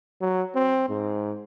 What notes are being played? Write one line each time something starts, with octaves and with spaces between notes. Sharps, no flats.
F#3
C4
G#2